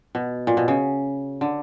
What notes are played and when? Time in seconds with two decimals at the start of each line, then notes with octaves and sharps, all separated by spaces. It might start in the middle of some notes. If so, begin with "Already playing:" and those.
0.15 B2
0.47 A#2
0.57 B2
0.68 C#3
1.41 D3